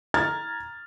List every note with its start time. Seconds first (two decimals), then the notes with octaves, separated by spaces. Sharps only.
0.14 A#5 F6 G#6 A6